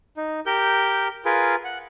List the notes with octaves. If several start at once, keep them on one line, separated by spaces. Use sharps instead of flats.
D#4
G4 A#4 G6
F4 G#4 A#4 B4
F#5